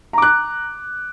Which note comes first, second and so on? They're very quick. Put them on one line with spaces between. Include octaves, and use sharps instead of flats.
A#5 D6 F#6